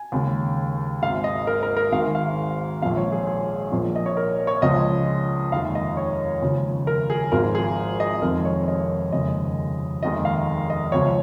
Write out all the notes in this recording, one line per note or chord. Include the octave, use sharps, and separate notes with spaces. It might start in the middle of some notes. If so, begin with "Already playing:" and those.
Already playing: G#5
D#2 C#3 G#3
G#1 G#2 G#3 F5
D#5
A#4
A#4
A#4
G#1 G#2 D#3 G#3 F5
F5
A#1 A#2 F3 G#3 F5
C#5
G#4
G#4
A#1 A#2 F3
D#5
C#5
A#4
C#5
C#2 C#3 F3 G#3 D#5
F1 D#2 D#3 G#3 F5
D#5
C#5
D#2 C#3 F3 G#3
A#4
G#4
G#1 G#2 F3 G#3 A#4
G#4
D#5
F1 F2 D#3 G#3 A#4
C#5
D#5
F1 D#2 C#3 G#3 D#5
F1 D#2 D#3 G#3 D#5
F5
D#5
C#2 C#3 F3 G#3 C#5